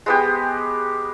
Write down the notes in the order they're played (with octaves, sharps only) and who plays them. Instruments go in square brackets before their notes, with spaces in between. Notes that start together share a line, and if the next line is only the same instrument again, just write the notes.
[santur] G#3 B3 G4